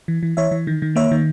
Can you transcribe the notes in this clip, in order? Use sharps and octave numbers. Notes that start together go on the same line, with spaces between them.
E3
E3
E3 C#5 E5
E3
D#3
D#3
A#3 C#5 E5
D#3